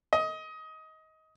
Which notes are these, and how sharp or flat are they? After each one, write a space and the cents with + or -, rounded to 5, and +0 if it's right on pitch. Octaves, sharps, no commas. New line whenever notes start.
D#5 +20